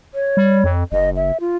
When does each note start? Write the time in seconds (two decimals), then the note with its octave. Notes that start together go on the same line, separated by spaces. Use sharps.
0.14 C#5
0.37 G3
0.64 F2
0.92 F#1 D#5
1.16 E5
1.40 F4